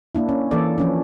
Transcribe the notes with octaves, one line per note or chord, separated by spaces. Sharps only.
A#3 D4 E4
C#4
E3 A#3 A4 D5
F3 C#4 D4